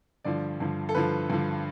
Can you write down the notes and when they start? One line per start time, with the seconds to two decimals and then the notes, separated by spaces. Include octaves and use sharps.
0.25 G2 D3 F3 D5
0.60 G2 D3 F3
0.89 A4
0.95 G2 D3 F3 B4
1.30 G2 D3 F3